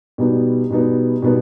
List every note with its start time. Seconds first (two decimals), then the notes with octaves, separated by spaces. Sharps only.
0.18 B2 G3 B3 D#4
0.70 B2 G3 B3 D#4
1.22 B2 G3 B3 D#4